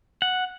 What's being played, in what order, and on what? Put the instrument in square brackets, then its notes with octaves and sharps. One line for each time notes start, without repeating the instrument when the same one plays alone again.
[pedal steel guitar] F#5